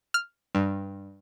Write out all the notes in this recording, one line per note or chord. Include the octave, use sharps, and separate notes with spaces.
F6
G2